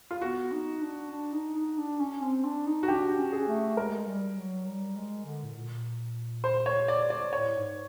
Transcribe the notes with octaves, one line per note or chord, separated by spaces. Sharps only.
F4
B3 F#4
D#4
D4
D4
D#4
D#4
D4
C#4
C4
D4
D#4
F#4
D4 G4
C#4
G#4
A3
G#3 A#4
G#3
G3
G3
F#3
G3
G#3
D3
A2
A#2
C5
C#5
D5
D5
A2 C#5
G#2